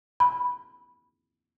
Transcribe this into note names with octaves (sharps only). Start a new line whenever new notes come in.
B5